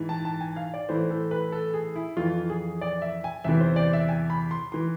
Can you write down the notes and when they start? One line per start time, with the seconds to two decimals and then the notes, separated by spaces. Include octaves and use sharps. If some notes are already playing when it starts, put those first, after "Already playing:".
Already playing: G#2 E3
0.09 A5
0.25 A5
0.41 G#5
0.56 F5
0.74 D5
0.89 A2 E3 C5
1.10 A4
1.31 B4
1.52 A4
1.74 G#4
1.96 E4
2.17 F2 E3 F4
2.49 G#4
2.81 D5
3.02 E5
3.24 G#5
3.44 E2 C3 E3 E5
3.61 C5
3.76 D5
3.93 E5
4.09 G#5
4.30 B5
4.51 C6
4.72 E3 C6